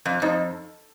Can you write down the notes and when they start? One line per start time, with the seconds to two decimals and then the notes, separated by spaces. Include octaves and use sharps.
0.06 F2
0.22 F2 D#4